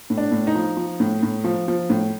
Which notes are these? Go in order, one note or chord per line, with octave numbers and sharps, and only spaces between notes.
A2
D4
A2
D#4
F3
F3
A2
A2
F3
F3
A2